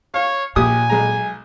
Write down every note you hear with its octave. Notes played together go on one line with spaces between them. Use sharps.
C#5 F5
A#1 A#2 G4 G#5 D#6
B1 G#3 A#5